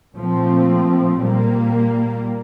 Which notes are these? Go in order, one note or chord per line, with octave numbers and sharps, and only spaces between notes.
A#2 F3 A3 C4
A#2 G3 A#3